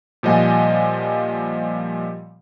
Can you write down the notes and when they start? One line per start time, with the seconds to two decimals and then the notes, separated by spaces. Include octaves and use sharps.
0.23 A#2 F3 G3 D#5 F#5 G#5